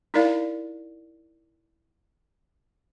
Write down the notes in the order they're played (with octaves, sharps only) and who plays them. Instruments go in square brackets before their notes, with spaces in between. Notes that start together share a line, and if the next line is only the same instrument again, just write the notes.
[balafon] D#4 E4 A#4 D5 F5